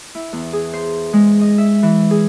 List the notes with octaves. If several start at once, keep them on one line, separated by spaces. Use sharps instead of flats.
E4
E2
G#4
C5
G#3
D#5
E5
E3
G#4